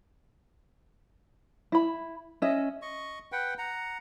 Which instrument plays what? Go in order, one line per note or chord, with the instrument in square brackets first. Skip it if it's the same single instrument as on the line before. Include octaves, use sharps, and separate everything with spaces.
[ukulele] E4 B5
C#4 D#5 E5
[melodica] D#5 C#6
B4 F#5 G5
F#5 A#5